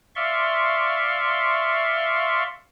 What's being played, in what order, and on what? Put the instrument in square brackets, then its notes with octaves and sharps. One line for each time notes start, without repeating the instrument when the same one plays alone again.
[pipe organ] D5 E5 F5 C6 C#6